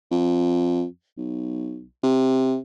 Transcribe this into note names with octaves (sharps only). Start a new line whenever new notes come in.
F2
B1
C3